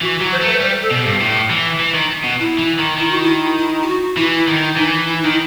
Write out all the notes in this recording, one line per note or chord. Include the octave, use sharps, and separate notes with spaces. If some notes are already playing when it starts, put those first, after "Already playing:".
E3 F#4
G4
F#3
C5
A3 B4
G3 C5
A4
B2
G4
G2
A2
E3
E3
D#3
B2
E4
E3
D#3
D#3 E4
F#4
E4
E4
G4
F#4
E3 E4
E4
D#3
E4
E3 D#4
E4
E4
D#4
D#3
E4